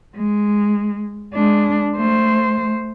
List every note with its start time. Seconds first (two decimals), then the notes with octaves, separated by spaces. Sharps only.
0.16 G#3
1.34 G#3 D4
1.97 A3 C5